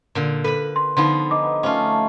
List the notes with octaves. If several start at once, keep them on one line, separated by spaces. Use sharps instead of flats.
A#2 D3
A4 B4 B5
C6
D3 F3 B3 D#4 C6
D#4 D6
F3 A3 C#4 F4